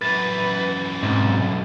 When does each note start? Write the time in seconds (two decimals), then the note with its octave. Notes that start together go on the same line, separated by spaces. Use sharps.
0.01 F#2 E3 B4 A6
1.03 B1 G#2 C3